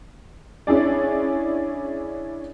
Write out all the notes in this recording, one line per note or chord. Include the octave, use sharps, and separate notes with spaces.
C#4 D4 E4 G#4 D5